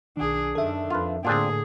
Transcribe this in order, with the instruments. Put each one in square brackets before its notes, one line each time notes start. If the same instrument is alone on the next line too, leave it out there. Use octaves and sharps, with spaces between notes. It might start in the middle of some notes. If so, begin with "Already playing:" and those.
[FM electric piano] B1 D#3 [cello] D4 G#4
[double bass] F#2 D#3 [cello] D4 [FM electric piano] A4 E5
[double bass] F2 [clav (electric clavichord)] F4 B4
[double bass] A2 D3 [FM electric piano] A#3 [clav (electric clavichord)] C4 D4 F4 [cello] G#4